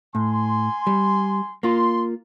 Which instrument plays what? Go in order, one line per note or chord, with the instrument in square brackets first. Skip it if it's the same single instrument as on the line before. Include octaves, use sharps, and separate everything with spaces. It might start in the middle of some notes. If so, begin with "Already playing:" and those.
[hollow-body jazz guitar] A2 [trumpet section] G#5 C6
[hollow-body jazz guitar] G3
[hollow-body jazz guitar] A#3 F4 [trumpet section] C6